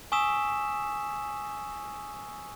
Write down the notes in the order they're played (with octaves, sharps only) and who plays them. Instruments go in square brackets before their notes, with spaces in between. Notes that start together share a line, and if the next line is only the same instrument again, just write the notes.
[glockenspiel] G#5 C#6 D#6 E6 B6 E7